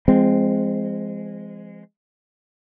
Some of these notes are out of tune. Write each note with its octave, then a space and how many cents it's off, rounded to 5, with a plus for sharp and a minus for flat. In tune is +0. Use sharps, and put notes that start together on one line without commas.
F3 -45 G#3 -10 C4 +0